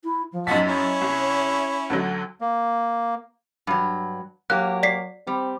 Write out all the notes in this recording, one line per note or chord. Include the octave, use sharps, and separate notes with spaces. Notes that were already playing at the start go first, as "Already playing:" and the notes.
E4
F3
F#2 D#4 F#4 F#5 A5 B6
C#4 E4 C#5
C2
D2 D3 F#3
A#3
G2 F#3
F#3 A#3 G4 F#6
D5 B6 C7
G3 C4